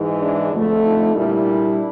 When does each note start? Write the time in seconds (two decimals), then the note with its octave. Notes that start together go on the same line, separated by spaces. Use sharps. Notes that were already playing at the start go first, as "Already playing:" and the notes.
Already playing: G#2 E3 G#3
0.20 D4 E4
0.52 F2 D3 F3 A3
0.83 D#4 F4
1.14 A#2 G3 A#3 D4 E4